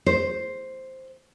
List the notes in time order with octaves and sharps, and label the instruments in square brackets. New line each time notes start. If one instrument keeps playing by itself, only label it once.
[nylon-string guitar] C5